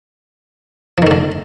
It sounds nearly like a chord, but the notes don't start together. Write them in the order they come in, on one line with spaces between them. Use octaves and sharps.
F3 D#3 A3 D3